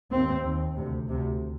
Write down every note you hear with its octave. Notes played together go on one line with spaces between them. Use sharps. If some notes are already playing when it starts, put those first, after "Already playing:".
D#2 C4
D#2
D2 C3
D2 C3